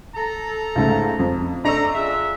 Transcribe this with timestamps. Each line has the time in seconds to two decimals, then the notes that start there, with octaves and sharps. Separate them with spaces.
0.15 A4 A#5
0.76 C#2 G#2 A3
1.19 F2
1.65 A3 D4 D#5 A#5 E6
1.94 G#3 F4 E5